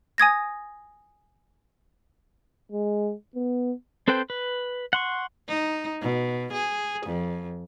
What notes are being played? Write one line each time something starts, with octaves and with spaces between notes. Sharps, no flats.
G#5 D#6 G#6 A#6
G#3
B3
C4 A4 B4 C5 G5
B4
F#5 C6 C#6
D#4
B2
G#4
F2